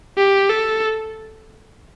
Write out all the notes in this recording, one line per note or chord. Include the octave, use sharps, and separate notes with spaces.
G4
A4